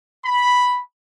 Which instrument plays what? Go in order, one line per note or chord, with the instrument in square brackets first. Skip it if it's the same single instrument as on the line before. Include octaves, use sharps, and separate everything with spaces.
[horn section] B5